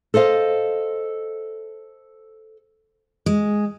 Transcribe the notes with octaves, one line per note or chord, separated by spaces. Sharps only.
A4 C5 D#5 F5
G#3